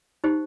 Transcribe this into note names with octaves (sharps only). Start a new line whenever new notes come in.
D#4 G4 C5